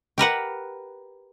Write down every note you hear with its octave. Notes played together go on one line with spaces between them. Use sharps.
G4 A#4 B4 F#5